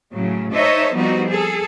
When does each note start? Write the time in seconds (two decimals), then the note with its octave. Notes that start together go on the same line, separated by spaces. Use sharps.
0.14 A2 C#3 F#3
0.52 D#4 A4 C5 C#5 D#5 E5
0.95 F3 G3 B3 C4 D#4 F#4
1.28 G#4 A4